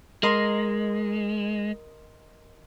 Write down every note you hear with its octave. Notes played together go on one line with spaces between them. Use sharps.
G#3 A#4 D#5 C6